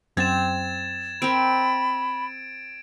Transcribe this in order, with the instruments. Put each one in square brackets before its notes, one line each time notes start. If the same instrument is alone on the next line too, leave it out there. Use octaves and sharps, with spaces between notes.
[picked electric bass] F#2 [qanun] C4 [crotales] G#6 A6 E7
[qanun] C4 A#4 [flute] B5 [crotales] D7